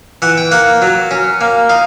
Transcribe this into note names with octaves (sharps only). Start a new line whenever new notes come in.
E3 F#5
G5
A#3 F#5
F#3
C#4
A#3
D#4 F5